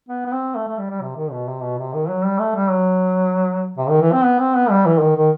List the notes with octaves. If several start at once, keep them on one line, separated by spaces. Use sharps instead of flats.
B3
B3
C4
A3
A3
G3
G3
C3
D#3
B2
C3
B2
C3
D#3
F#3
G3
A3
G3
F#3
C3
D#3
E3
C4
B3
C4
B3
G3
E3
D#3
D#3